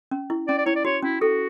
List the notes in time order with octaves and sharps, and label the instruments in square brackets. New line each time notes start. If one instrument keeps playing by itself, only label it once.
[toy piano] C#4
E4
[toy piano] C#4 [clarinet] D5
[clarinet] D5
[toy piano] E4 [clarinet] C#5
[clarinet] D5
[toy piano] F#4 [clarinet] C#5
[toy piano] C#4 [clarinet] E4
[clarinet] F#4 [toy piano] A4